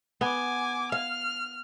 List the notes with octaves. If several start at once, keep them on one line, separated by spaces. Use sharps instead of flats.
B3 G#5 D6
F5 F6